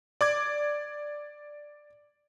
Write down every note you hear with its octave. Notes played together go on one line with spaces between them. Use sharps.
D5 D6 G#6